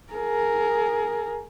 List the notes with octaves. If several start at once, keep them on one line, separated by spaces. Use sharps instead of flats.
G#4 A#4